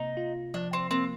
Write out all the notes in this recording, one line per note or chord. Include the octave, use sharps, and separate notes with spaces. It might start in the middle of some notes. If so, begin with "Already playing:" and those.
Already playing: C3 A#3 D#4
F4
F3 D4
C4
A#3 C4